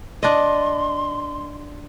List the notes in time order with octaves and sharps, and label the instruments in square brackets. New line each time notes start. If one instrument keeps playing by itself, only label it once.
[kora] D4 D#5 [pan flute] C6